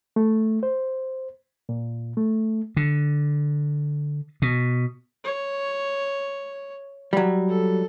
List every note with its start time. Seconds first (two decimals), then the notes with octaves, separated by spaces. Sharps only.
0.16 A3
0.63 C5
1.69 A#2
2.17 A3
2.77 D3
4.42 B2
5.24 C#5
7.13 F#3 G3
7.48 A4